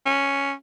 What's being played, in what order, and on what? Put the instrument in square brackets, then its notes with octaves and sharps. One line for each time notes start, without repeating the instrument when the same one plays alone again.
[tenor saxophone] C#4